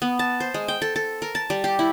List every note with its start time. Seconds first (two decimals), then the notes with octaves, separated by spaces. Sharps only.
0.02 B3
0.19 A5
0.40 C5
0.54 G#3
0.68 G5
0.82 A4
0.96 A4
1.22 A#4
1.35 A5
1.50 G3
1.64 G4
1.79 E4